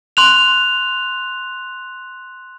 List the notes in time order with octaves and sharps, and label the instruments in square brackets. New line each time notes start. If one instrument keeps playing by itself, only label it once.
[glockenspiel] C6 F#6 F7